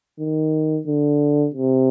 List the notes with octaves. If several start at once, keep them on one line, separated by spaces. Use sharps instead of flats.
D#3
D3
C3